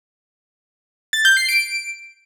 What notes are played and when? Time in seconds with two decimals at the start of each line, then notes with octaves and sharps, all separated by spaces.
1.13 A6
1.25 G6
1.37 C7
1.49 D7